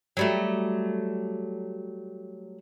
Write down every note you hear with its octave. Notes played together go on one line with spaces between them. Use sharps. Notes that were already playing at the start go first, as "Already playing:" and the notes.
F#3 G3 A3